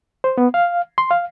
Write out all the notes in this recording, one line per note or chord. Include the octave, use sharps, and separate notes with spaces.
C5
B3
F5
C6
F5